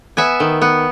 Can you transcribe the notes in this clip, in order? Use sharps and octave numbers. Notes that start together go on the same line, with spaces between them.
B3 E5 G#5
D#3
B3